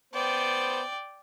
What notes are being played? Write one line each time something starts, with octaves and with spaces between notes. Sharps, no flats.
B3 C5 D5 G5